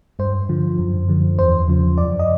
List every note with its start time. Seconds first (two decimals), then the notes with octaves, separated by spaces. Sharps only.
0.19 G2 C5
0.49 D3 F3
0.79 F#2
1.08 D3 F3
1.39 E2 C5
1.68 C#3 F3
1.97 F#2 D5
2.19 D#5